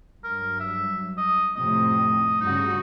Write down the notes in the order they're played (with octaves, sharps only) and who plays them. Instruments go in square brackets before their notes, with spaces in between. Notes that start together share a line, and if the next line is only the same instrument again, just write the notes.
[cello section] G2 F#3 [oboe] A#4
[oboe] E5
D#5
[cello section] F2 A2 C3 [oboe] D#5
[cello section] G2 C#3 F#4 [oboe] D#4